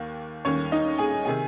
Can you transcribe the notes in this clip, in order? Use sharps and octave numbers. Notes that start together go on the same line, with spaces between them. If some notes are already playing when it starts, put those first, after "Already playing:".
Already playing: D#2 D#3 A#3
D#2 D#3 C#4 C#5
D#4 D#5
G#4 G#5
C3 D#3 G#4 G#5